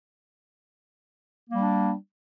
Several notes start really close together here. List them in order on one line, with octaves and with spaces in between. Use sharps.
A#3 G3 D4